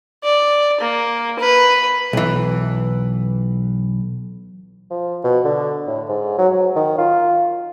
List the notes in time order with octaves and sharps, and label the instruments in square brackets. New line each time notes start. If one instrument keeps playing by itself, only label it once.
[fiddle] D5
A#3
B4
[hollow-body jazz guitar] B1 E3
[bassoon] F3
B2
D3
A2
G#2
F#3
F#3
D#3
F4